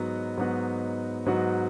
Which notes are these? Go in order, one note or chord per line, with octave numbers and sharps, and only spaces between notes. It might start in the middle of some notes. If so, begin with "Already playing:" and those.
Already playing: G#2 F#3 B3 D#4 F#4
G#2 F#3 B3 D#4 F#4
G#2 F#3 B3 D#4 F#4